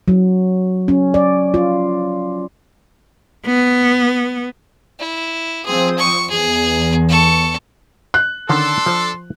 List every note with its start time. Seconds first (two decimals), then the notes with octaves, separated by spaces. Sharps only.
0.08 F#3
0.88 C#4
1.14 D5
1.54 F4
3.46 B3
5.00 E4
5.66 F3 C4 G#4 D#6
5.98 C#6
6.30 E2 G#4
7.09 A4 C#6
8.14 F#6
8.49 D3 D#3 C#4 D4 A4 C6
8.86 F3 C5